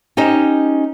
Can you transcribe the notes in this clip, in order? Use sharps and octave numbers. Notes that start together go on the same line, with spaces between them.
C#4 D#4 G4 C5 D#5